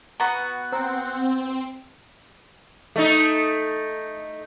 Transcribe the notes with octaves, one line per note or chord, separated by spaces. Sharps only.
B3 F#4 F#5 A#5 B5
C4 C5 A#5
A3 D#4